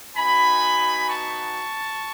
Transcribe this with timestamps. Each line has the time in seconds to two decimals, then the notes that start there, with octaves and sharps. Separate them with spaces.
0.16 B3 D#4 F#4 G#5 B5
1.09 A5 C#6